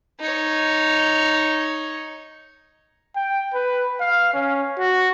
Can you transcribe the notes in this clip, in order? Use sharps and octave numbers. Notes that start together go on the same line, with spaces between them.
D#4 C#5
G5
B4
F5
C#4
F#4